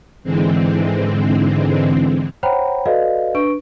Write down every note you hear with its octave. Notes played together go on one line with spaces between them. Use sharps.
G#2 D3 E3 G#3 C4
C5 C#5 F#5 G5 A#5 B5
F#4 A4 B4 D5 D#5 F5
D4 B4 C#6 D7